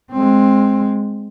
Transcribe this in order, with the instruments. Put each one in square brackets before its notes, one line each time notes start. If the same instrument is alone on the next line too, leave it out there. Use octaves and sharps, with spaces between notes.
[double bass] G#3 C4